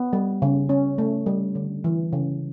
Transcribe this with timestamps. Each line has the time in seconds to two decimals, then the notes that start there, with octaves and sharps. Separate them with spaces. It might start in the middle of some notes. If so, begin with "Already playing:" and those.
Already playing: B3
0.13 G3
0.42 C#3
0.69 C#4
0.98 A3
1.26 G3
1.55 D3
1.84 E3
2.13 C#3